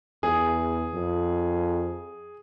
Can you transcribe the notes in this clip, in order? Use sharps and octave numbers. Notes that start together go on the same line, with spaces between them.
E2 G#4
F2